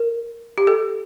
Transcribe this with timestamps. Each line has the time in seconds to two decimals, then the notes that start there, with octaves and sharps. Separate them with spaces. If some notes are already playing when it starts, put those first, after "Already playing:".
Already playing: A#4
0.58 G4
0.67 A4